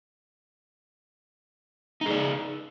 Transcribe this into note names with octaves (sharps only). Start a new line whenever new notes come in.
D#4 G#4 D5